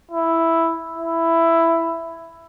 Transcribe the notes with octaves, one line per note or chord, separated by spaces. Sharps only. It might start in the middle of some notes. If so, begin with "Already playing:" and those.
E4
E4